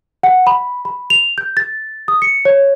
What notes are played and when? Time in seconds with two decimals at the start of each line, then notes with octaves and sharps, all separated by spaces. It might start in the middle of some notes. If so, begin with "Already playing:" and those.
0.23 F#5
0.47 B5
0.85 B5
1.10 F7
1.38 G6
1.57 A6
2.08 D#6
2.22 C#7
2.45 C#5